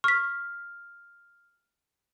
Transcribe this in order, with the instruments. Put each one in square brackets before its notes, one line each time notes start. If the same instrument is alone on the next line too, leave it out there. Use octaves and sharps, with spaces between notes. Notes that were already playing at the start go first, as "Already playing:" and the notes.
[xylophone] C#6 B6 [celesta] F6